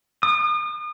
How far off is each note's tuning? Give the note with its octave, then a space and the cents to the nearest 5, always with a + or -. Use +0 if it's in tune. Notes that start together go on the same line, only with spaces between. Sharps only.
D#6 -40